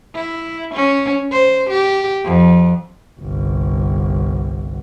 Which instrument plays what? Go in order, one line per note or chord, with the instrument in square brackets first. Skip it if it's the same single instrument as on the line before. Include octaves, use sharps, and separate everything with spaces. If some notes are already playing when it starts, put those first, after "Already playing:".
[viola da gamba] E4
C#4
C5
G4
F2
[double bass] G1 C2